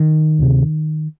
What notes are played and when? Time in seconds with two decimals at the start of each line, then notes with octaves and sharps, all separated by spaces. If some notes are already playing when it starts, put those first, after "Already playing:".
Already playing: D#3
0.39 D2 C3